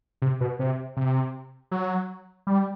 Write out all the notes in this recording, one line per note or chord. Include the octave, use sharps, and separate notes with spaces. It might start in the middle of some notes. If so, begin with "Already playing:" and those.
C3
B2
C3
C3
F#3
G3